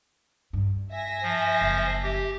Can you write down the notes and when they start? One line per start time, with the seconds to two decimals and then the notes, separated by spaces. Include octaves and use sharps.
0.53 G2
0.92 E5 G#5 A#6
1.23 F3
1.61 F#1
2.03 G4